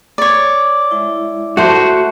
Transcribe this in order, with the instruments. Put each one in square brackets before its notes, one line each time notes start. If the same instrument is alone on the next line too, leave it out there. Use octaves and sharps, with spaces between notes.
[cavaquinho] C#5 D5
[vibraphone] G#3 E4 E5
[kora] A3 C5 [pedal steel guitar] F#4